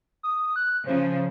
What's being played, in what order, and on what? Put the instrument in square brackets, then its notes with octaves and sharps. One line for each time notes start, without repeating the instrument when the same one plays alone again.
[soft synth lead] D#6
F#6
[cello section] C#3 F3 [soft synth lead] C5